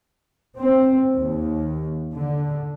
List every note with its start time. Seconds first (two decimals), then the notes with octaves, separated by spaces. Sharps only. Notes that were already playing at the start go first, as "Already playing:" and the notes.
0.56 C4
1.15 D#2
2.14 D3